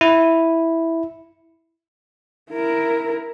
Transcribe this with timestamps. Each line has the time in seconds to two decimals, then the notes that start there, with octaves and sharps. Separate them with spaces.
0.01 E4
2.51 E4 A#4